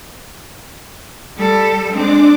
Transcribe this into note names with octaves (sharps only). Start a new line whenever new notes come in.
G3 A4
G#3 C4 D4 D6